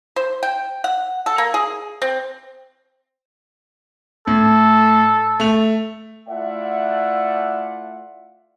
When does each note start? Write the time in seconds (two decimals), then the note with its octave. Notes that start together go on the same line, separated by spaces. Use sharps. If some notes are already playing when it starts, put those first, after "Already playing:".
0.16 C5
0.43 G5
0.84 F#5
1.26 A4
1.38 A#3
1.54 G#4
2.02 C4
4.27 A2 A4
5.40 A3 F7
6.29 A3 E4 F4 D5 E5 F#5